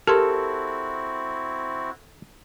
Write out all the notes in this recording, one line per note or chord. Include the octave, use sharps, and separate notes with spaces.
C4 E4 F#4 G4 A4 A#4 C6